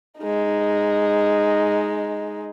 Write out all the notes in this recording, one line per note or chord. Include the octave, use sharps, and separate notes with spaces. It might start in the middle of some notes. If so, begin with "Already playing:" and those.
G#3 D#4